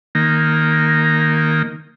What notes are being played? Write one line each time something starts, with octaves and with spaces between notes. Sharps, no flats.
D#3 A#3